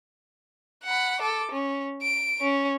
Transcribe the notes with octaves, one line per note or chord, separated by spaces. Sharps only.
F#5 B5
A4 D6
C#4
D7
C#4